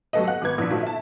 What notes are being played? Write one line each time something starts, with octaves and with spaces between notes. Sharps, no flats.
F#3 A3 G4 A4 B4 D#5
F#5 F#6
G#1 B3 B4 G#6
A#1 D4 B6
A#2 F3 A3 D#4 F#4
E5 A5